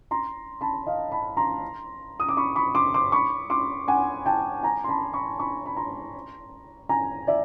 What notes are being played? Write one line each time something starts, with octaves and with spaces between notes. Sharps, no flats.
A#5 C6
A5 B5
D#5 F5
A5 B5
A#5 C6
D#6
D6
B5 C#6
B5 C#6
C6 D6
C6 D6
B5 C#6
C6 D6
F#5 G#5
G5 A5
G#5 A#5
C6
A5 B5
B5 C#6
B5 C#6
B5
A#5 C6
G#5 A#5
D5 E5